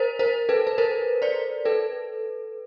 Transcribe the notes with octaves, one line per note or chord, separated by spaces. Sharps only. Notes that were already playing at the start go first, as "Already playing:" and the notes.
Already playing: A#4 C5
A#4 C5
A4 B4
B4
A#4 C5
C5 D5
A4 B4